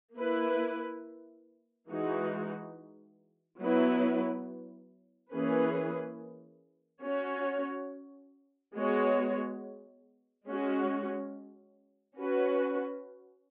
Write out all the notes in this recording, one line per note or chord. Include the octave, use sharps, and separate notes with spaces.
A#3 E4 B4
E3 G#3 D#4 F#4
F#3 B3 E4 B4
E3 A#3 C#4 G#4 B4
C#4 F#4 C#5
G#3 B3 F#4 C#5
G#3 C#4 F#4
C#4 F#4 B4